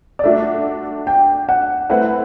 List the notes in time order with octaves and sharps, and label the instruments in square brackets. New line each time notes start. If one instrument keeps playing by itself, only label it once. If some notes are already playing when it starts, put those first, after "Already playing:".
[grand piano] D5
[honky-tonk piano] A3 D4 F#4 [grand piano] E5
[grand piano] G5
F#5
[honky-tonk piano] A3 C4 E4 B4 [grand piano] F#5